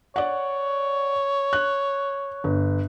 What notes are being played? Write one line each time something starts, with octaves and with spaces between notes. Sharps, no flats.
C#5 D5 F#5
F#6
G1